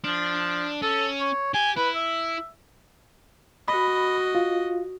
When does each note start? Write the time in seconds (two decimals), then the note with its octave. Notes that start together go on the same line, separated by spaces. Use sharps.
0.04 F3 D4
0.82 C#4 A4
1.20 C#5
1.54 G4 G#5
1.76 E4 B4
1.95 E5
3.68 F#4 D#5 B5
4.35 F4